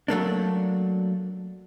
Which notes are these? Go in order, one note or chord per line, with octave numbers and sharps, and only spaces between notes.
F#3 A3 A#3 D4